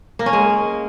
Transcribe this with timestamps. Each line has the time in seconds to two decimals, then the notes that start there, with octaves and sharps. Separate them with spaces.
0.19 A#3
0.26 C#4
0.33 G#3